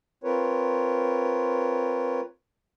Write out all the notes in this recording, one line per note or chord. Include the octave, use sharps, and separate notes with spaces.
C4 F4 A#4 B4 C#5